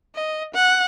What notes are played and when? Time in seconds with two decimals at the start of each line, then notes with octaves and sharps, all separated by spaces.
0.15 D#5
0.54 F#5